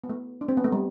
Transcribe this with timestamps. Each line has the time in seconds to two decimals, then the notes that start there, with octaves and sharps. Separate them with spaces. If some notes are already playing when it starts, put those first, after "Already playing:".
0.04 B3
0.09 A3
0.41 D4
0.49 C4
0.57 B3
0.64 A3
0.72 G3